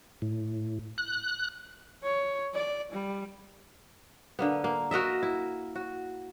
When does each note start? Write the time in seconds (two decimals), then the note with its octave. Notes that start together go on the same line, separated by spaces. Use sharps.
0.22 A2
0.98 F#6
2.03 C#5
2.54 D5
2.93 G3
4.39 D3 A#3 B3
4.64 A#3
4.91 F#4 A#4 D#5 E5
5.23 E4
5.76 F#4